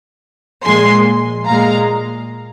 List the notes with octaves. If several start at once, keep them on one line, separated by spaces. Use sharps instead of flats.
A#2 F3 G#3 G#5 C6
A#2 G#3 F5 A#5